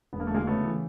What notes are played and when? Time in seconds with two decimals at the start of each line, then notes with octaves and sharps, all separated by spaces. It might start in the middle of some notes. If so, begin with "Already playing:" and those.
0.13 E1 B3
0.20 A#3
0.27 A3
0.30 D2 G#3 A#3
0.47 C#3 A3 B3
0.65 E3